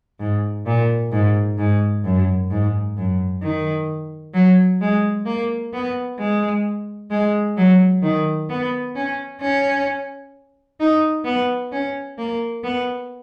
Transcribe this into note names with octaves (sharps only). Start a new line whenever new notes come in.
G#2
A#2
G#2
G#2
F#2
G#2
F#2
D#3
F#3
G#3
A#3
B3
G#3
G#3
F#3
D#3
B3
C#4
C#4
D#4
B3
C#4
A#3
B3